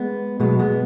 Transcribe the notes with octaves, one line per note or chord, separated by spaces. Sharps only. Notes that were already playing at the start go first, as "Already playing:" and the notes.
Already playing: G#3 B3
B2 F#3 G#3 B3
G#3 B3